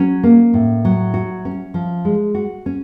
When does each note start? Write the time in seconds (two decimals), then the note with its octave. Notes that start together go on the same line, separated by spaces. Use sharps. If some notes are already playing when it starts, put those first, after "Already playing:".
Already playing: F#3 C#4
0.23 A#3
0.54 A2
0.85 F#3
1.14 F#4
1.45 C#4
1.74 F3
2.05 G#3
2.35 F#4
2.66 C#4